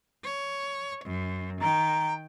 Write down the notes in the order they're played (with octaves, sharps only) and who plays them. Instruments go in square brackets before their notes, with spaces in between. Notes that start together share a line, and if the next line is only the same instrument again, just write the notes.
[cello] C#5
F#2
[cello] D#3 G5 [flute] A#5